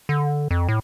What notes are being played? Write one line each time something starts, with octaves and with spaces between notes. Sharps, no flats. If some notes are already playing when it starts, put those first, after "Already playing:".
D3
F2
A2